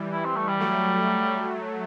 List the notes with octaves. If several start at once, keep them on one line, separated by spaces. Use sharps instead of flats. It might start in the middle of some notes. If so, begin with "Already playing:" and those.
Already playing: E3 G3
E4
C4
A3
G3
F#3 A3